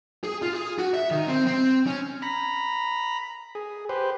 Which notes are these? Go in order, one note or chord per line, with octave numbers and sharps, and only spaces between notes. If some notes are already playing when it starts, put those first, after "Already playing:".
G#4
F4
G#4
F#4
E5
D#3
C4
C4
C#4
A#5 B5
G#4
G4 B4 C5